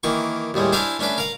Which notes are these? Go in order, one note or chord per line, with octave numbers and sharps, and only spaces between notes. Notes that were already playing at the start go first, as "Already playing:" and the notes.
D#3 E3 A#3 C#6
D#2 A2 G3 G#3
D4 E4 C5 E5 F5 G#5
A3 C#4 D4 B4 D5
A#4 F5